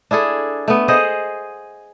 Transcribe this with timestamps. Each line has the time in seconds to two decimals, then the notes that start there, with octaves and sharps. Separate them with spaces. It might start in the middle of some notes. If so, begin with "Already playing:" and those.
0.11 D4 E4 G#4 A4
0.68 A3 B3
0.88 G#4 C5 D#5 F#5